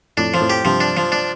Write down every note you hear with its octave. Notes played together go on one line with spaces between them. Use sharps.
F2 A2 D4
F3
F2 A2
G4
G2 C3 F3
D4
F3
D4